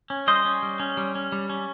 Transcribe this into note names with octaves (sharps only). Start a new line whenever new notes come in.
C#4
G3 C5 D#5
C#4
G3
C#4
G3
C#4
G3
C#4